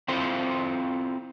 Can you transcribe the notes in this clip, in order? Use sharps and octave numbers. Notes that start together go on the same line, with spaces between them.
C4 E4 F4 A4 C5